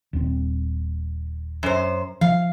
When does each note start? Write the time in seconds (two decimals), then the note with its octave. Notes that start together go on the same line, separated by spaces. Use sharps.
0.13 D#1 C4
1.63 F#2 C5
2.21 F3 F5